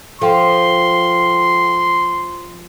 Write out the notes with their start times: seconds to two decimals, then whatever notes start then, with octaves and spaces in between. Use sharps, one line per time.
0.22 F3 A4 F5 G5 C6